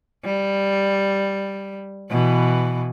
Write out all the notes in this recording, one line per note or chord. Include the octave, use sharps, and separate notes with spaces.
G3
B2 E3